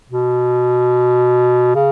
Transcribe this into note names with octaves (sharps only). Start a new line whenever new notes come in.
B2
C#3